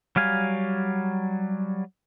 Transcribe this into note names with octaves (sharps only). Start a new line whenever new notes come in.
F#3 G3 F5 G#5